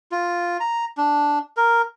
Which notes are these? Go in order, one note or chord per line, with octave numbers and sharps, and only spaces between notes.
F4
A#5
D4
A#4